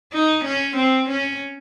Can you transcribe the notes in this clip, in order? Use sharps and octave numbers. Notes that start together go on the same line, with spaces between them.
D#4
C#4
C4
C#4